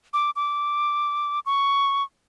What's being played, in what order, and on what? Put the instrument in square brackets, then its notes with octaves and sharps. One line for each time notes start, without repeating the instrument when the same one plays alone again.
[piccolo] D6
D6
C#6